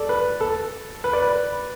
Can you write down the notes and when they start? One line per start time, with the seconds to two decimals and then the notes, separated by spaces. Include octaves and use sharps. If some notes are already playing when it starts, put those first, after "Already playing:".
Already playing: A4 D5
0.09 B4
0.41 A4
1.04 B4
1.13 D5
1.22 B4